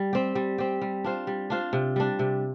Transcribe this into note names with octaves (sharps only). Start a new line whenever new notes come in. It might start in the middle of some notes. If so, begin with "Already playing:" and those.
Already playing: G3
C4 G4
G3
C4 G4
G3
D4 F4 C5
G3
D4 F4 C5
C3
G3 D4
C3